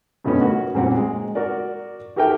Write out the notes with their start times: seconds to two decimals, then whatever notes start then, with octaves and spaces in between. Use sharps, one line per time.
0.24 G2 B2 A3 B3 C#4
0.41 F#4 A#4
0.75 A#2 G3 C4 C#4 F#5
0.96 G#3
1.35 F#4 A#4 D5
2.16 F#4 G4 A4 A#4 E5 G5